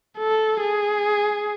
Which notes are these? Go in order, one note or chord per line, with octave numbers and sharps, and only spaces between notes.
A4
G#4